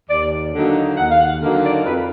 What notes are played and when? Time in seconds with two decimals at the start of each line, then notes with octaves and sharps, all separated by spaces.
0.10 D#2 D5
0.54 D3 F#3 A#3 D#4
0.97 D#2 F#5
1.10 F5
1.19 F#5
1.40 D3 F#3 A#3 D#4 F5
1.63 D5
1.84 F2 B4